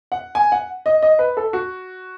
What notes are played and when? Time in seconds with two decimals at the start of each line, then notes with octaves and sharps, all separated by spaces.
0.12 F#5
0.35 G#5
0.52 F#5
0.86 D#5
1.02 D#5
1.19 B4
1.37 A4
1.53 F#4